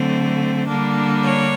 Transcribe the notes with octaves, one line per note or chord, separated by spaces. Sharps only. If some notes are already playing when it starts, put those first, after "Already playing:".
Already playing: D3 F#3 A3 C4
D3 G3 A#3 D4
C#5